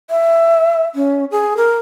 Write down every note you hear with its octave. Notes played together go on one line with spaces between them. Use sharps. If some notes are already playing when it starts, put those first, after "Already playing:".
E5
C#4
G#4
A#4